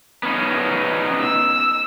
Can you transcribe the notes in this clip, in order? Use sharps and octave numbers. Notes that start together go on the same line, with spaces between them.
B3 C#4 D#4
E6